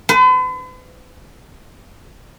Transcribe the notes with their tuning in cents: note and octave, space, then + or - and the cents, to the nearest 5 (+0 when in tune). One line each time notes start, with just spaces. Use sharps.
B4 +45